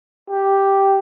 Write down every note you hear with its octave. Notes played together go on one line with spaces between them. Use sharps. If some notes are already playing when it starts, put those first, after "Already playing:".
G4